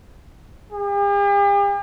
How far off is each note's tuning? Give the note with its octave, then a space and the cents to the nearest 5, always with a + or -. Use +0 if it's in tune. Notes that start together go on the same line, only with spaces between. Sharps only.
G4 +45